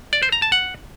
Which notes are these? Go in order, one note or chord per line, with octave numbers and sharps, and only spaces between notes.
D5
C5
A#5
A5
F#5